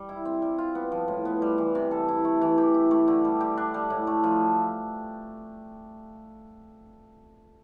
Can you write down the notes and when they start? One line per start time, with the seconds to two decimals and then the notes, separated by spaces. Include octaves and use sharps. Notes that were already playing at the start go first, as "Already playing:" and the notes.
Already playing: G3
0.09 E4
0.25 C4
0.42 G3
0.58 F4
0.75 B3
0.92 F3
1.08 A2
1.25 B3
1.42 G3
1.58 E3
1.75 C3
1.91 A4
2.08 E4
2.25 A3
2.41 E3
2.58 G4
2.74 E4
2.91 A3
3.08 D3
3.24 G3
3.41 G4
3.57 D4
3.74 G3
3.90 A2
4.07 A3
4.24 F3